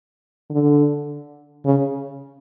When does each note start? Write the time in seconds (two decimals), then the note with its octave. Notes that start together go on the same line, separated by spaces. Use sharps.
0.50 D3
1.65 C#3